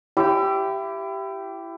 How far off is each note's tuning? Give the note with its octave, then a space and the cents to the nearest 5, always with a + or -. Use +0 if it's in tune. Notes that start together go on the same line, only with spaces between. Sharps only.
E4 +25 G4 -10